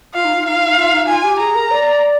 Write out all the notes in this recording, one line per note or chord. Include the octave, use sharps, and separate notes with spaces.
F4 F5
D#4
F4
D#4 F5
F4
D#4
F4
D#4
F4 G#5
G4
G#4 A#5
A#4
D5